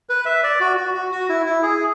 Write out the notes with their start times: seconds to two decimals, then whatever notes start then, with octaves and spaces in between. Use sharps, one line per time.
0.09 B4
0.25 E5
0.44 D5
0.60 F#4
0.77 F#4
0.94 F#4
1.12 F#4
1.29 E4
1.46 E4
1.63 G#4